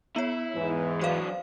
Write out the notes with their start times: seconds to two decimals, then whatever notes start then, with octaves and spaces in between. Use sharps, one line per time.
0.16 B3 E4 C#5
0.55 E2 G#2 E3
1.01 F#3 D4 C5 F5